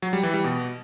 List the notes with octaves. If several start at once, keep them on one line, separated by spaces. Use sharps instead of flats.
F#3
G3
E3
G3
B2